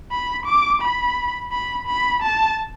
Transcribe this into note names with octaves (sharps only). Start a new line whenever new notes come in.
B5
D6
B5
B5
B5
A5